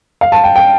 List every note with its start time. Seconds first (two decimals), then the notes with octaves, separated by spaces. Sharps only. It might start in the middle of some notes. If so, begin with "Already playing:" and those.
0.21 F5
0.32 A5
0.44 G5
0.56 G5